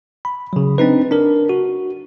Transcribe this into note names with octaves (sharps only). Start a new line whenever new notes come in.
B5
C#3 F#3
C4 D4 D#4 B4
D4 A#4
F#4